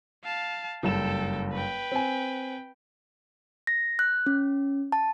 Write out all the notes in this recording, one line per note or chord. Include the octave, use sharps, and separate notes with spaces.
F5 A5
F#1 G2 A4 G5 E7
B4 G5
C4 G#5
A#6
F#6
C#4
A5